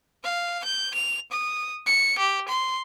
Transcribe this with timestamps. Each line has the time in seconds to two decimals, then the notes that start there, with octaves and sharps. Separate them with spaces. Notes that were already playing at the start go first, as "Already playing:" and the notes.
0.23 F5
0.64 G6
0.94 F7
1.32 D#6
1.86 C#7
2.18 G4
2.49 C6